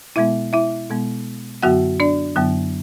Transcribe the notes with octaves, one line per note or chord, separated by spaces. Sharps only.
B2 G#3 B3 E4 E5
E4 E5
B2 G#3 B3
F#2 D3 F#3 B3 F#4 F#5
D4 D5
F#2 D3 F#3 B3